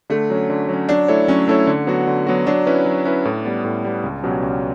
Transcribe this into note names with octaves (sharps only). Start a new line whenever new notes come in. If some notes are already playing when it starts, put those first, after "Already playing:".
D3 A3
F#3 C#4
D3
F#3
C#4
F#3 D4
A3 E4 A4 C#5
F#3 C#4
A3 E4 A4 C#5
D3
F#3 B3 F#4
D3
F#3 B3 F#4
F#3 D4
C#4 E4 B4
F#3
C#4 E4 B4
A2
G3 B3
A2
G3 B3
C#2
B2 F#3 C#4 G4
C#2